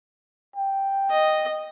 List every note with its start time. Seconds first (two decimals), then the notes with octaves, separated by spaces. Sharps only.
0.56 G5
1.11 D#5